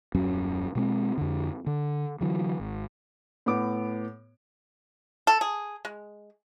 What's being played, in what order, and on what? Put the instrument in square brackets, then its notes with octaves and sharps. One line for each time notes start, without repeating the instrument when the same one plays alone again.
[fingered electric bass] D#1 F#2 F#3 C#4
B2 G#3 C4
F2 D3
D3
D3 E3 F#3
G#1
[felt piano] A2 B3 D6
[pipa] A4
G#4
G#3